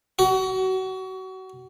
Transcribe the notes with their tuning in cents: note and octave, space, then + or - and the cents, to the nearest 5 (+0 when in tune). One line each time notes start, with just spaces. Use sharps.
F#4 +30